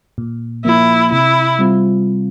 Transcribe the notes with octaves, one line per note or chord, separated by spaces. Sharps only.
A#2
F3 A#3 E4
C3 E4
G3 C4 F4